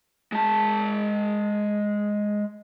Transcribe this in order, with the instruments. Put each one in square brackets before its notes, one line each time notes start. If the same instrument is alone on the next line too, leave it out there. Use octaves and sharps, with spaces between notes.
[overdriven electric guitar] G#3 A5